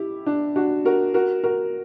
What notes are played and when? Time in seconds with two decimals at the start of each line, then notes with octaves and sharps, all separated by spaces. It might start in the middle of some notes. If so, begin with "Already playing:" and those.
Already playing: E4 G4
0.26 D4
0.56 D4 F#4
0.85 F#4 A#4
1.14 F#4 A#4
1.44 F#4 A#4